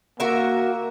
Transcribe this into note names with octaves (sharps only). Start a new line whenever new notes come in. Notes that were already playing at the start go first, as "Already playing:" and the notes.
A#3 F#4 A#4 E5